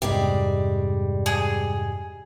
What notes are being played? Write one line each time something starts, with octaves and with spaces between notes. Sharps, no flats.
F2 G#2 C3 G3 G#3 D5
G#4